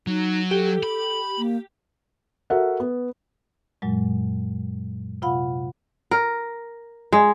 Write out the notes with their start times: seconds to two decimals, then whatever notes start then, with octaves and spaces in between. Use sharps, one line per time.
0.07 F#3 D#4
0.51 G4 A4
0.83 B5
1.38 A#3
2.50 F#4 A4 A#4 E5 F#5
2.80 B3
3.82 F#2 A#2 F#3 G#3
5.22 C3 F4 F5 F#5 B5
6.11 A#4
7.12 G#3